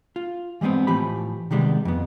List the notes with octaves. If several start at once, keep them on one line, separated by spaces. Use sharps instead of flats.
F4
E3 G3 G#3 B3 C4
A2 E3 F3 G4 B5
C3 D#3 G3 G#3 B3
F2 B3